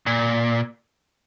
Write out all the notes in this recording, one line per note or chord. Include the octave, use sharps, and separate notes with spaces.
A#2